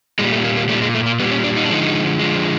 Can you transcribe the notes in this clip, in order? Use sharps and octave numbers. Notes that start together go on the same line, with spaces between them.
A#2 G3 G#3
A3
A#3
A#3
A#2 G3 A3
G#3
A3
A#3
A#2 G3 B3
C#4
D4
D#4
D4
D3 F3 G#3 D#4
D3 F3 G#3